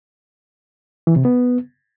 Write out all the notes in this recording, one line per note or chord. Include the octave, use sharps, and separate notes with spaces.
E3
C3
B3